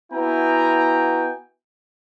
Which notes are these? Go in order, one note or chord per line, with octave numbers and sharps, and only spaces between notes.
B3 E4 F#4 G5 G#5 A#5